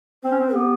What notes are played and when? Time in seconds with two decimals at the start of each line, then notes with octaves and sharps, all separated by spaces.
0.24 C4 C5
0.32 C#4
0.39 C4
0.54 B3 G4